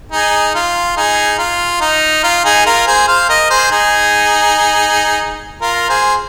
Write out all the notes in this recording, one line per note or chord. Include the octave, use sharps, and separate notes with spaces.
D#4 G#4
F4
D#4 G#4
F4
D#4
F4
D#4 G#4
F4 A#4
G#4 C5
C5 F5
A#4 D#5
G#4 C5
D#4 G#4
F4 A#4
G#4 C5